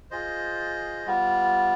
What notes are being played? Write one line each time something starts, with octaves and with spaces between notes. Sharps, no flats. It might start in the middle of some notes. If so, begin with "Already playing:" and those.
F4 G#4 C5 D#5
G3 B3 F4